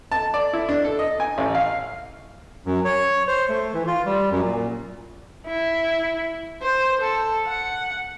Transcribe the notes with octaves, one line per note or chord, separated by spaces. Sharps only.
A5
D5
E4
D4
A4
D#5
G#5
A1
F5
F#2
C#5
C5
A3
E3
F4
G3
F#2
A#2
E4
C5
A4
F#5